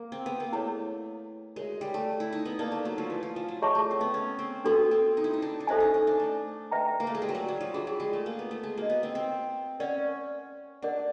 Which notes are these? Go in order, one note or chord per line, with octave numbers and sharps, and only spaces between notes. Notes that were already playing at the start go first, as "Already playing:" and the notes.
Already playing: A#3
C4
B3
A#3
A3 E4 G#4 C#5 F5
G#3 F#4 A#4 C#5 E5
G3
A3
E4
D#4
B3
A#3 B4 D5 F5 A5
A3
F#3
F3
E3
F3
F3
F#3
G3 G#4 C#5 E5 A5 C#6
A3
C4
B3
C#4
C4
B3 D4 F#4 A4
C4
D#4
E4
D#4
D4
D4
C#4 A4 C5 E5 G#5
D#4
D#4
D4
A3
B4 E5 G5 A#5
A#3
A3
G#3
G3
F#3
G3
F#3
F3
F#3 D4 F4 G#4
G3
G#3
A3
A#3
B3
A3
G#3
A#3 D#4 F#4 A#4 D#5
B3
C4
C4
C#4 A#4 D5 F#5
D4 A#4 D5 F#5